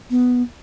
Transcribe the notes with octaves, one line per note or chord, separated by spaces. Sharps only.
B3